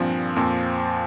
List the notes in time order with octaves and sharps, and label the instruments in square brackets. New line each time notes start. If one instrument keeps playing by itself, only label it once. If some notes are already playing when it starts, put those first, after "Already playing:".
Already playing: [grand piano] G2 [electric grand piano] A#2 F3 C4
[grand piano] F2 [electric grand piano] A#2